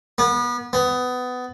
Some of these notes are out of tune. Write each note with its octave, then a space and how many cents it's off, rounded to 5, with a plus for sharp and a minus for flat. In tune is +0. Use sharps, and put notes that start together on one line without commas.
B3 -30
B3 +20